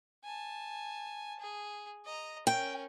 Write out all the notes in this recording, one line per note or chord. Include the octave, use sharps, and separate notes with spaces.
G#5 A5
G#4
D#5 A#5
C#4 A#4 G5